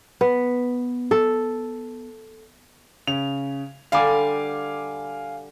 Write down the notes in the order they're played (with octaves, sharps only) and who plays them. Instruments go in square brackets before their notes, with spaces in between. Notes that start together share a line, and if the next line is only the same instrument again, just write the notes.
[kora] B3
A4
[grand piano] C#3 F7
[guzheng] D3 G3 D5 [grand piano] F5 G#5 D6